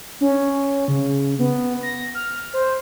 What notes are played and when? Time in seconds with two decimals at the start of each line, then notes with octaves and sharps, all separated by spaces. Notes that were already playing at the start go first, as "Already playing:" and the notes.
0.21 C#4
0.88 C#3
1.39 B3
1.83 A#6
2.15 F6
2.53 C5